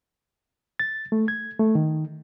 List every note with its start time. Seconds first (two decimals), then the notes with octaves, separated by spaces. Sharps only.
0.80 A6
1.12 A3
1.28 G#6
1.59 A3
1.75 D#3